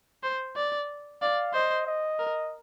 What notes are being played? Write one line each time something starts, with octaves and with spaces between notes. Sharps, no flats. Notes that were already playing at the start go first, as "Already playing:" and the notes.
C5
D5
D5 F5
C5 D#5
D#5
A#4